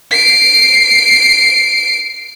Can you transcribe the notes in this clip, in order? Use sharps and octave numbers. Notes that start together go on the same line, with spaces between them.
C7 D7